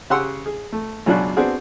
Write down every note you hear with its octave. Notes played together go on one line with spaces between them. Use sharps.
C#3 G4 F#5 C6 E6
G#4
A3
C#2 F#2 B2 D4 F#6
B3 C4 D4 F#4 G#4